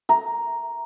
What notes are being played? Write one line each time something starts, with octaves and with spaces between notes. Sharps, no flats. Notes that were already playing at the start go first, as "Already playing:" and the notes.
A#5